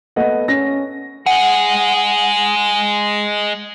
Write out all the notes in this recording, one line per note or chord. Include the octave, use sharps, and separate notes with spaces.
A3 B3 D#5 F#5
C#4 A#6
G#3 G#4 F#5